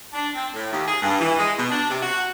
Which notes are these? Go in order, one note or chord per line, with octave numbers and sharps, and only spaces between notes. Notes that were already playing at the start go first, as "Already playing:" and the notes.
D4
C4
A2
D#2
G#4
G2
E3
G#3
B2
D4
C3
F#4